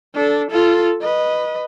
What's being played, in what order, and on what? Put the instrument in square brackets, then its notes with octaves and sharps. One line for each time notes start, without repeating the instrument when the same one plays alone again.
[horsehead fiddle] D4 A4
F4 A4
B4 D#5